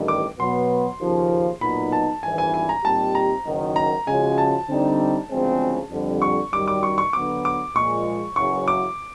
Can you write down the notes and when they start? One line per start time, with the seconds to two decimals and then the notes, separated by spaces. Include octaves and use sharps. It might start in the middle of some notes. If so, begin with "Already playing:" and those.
Already playing: A1 G2 D#3 G3
0.08 D6
0.39 B2 F#3 B3 C6
1.00 D#2 C#3 F3
1.61 B1 A#2 F#3 B3 D#4 B5
1.92 A5
2.23 G#1 G2 E3 G#5
2.38 G#5
2.54 G#5
2.69 A#5
2.84 A#2 G3 C4 D#4 G4 A5
3.15 A#5
3.45 F#1 F#2 D#3 F#3
3.76 A#5
4.07 C#3 F3 G#3 C#4 F#4 G#5
4.38 A5
4.68 D3 G3 C4 D#4
5.29 D2 C#3 F3 G#3 C4
5.91 F2 D3 G3
6.22 C#6
6.52 F#2 D#3 G3 D6
6.68 D6
6.83 C#6
6.98 C#6
7.13 D3 F#3 B3 D6
7.45 D6
7.75 A#2 F3 G#3 C#6
8.36 F#1 E2 C#3 F#3 C#6
8.68 D6